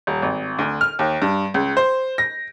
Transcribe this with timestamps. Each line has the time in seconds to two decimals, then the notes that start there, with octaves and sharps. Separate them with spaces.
0.07 D#1
0.23 G#1
0.59 D2
0.81 F6
0.99 D#2
1.22 G2
1.54 C#2
1.77 C5
2.18 A#6